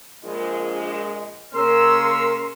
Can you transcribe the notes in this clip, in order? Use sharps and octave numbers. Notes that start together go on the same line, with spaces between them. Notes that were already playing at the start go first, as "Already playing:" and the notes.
A#1 G#3
C#3 A#3 C#4 A#4 C6 E6